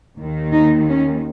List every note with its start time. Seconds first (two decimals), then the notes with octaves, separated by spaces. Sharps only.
0.16 D#2 D#3
0.52 D#4
0.88 C#4